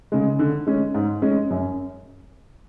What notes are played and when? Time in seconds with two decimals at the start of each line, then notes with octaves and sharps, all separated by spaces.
0.12 C#3 G#3
0.39 D3
0.67 G#3 C#4
0.95 G#2
1.22 G#3 C#4
1.50 F#2